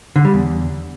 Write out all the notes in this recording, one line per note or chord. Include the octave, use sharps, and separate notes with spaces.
D3
G3
E2